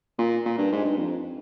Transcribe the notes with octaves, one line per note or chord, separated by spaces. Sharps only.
A#2
A#2
G2
G#2
G2
F2